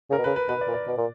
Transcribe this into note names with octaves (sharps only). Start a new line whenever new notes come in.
C#3 A#4
B2
C#3 B4
B4
B2 B4
D5
A#2
D5
B2
A#2